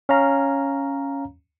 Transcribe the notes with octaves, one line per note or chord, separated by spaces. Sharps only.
C#4 C#5 F5 A#5